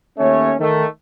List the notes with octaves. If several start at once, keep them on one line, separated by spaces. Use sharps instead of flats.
D#2 A3 C#4 C#5
D#3 A3